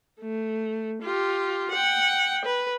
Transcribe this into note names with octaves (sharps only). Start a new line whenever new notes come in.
A3
F4 G4
F#5 G5
B4